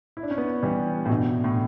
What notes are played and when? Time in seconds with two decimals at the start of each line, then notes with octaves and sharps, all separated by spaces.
0.17 E4
0.23 D4
0.31 C#4
0.37 B3 D4
0.63 E3 G3
1.06 A2
1.09 G2 B2
1.44 A2